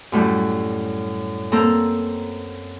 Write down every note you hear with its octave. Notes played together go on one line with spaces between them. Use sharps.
F#2 A2 G3
A#3 C4 A4 A#5